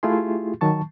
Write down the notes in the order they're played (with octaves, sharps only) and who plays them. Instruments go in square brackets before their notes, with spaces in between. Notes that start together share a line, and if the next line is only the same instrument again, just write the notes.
[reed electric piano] A3 E4 F4 G4 G#4 C6
D#3 F#3 A5 C#6